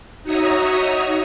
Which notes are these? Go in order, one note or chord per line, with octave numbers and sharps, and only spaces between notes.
D#4 F#4 C#5 E5 A#5 D#6